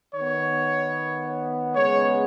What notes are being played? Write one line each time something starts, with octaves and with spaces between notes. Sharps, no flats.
D#3 B3 C#5
C#3 G#3 B3 C#5